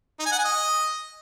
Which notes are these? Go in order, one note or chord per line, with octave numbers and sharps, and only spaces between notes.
D#4
G#5
F#5
G#5
D#5